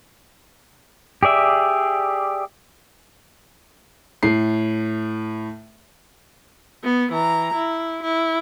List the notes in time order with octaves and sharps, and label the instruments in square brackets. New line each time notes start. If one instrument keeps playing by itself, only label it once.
[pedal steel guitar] G4 G#4 D5 E5
[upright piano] A2 C7
[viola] B3
E3 A#5
E4
E4